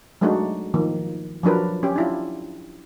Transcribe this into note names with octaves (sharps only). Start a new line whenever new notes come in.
F#3 G#3 A3 D4 D#4 F#4
D#3 F3 A#3
F3 F#3 D4 A#4 B4
C#4 G4
D4 E4 F4